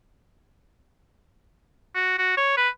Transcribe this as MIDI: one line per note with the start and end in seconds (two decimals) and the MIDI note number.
1.95 2.14 66
2.19 2.37 66
2.37 2.54 73
2.57 2.69 71